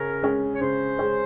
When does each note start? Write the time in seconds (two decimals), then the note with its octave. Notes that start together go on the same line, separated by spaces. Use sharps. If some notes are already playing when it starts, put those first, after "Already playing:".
Already playing: C#3 C#4 A#4
0.22 G#3 C#4
0.54 C#5
0.61 C#3 C5
0.99 G#3 C#4